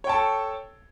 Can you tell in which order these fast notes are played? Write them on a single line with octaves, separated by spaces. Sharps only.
C#5 G5 A5 C#6 A4